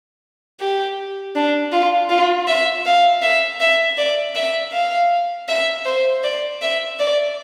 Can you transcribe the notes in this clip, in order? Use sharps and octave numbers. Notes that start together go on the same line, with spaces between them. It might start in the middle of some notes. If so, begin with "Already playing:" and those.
G4
D4
F4
F4
E5
F5
E5
E5
D5
E5
F5
E5
C5
D5
E5
D5